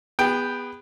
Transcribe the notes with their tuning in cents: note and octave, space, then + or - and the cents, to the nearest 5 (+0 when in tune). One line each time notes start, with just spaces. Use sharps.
B3 +0 G#4 -35 G5 +0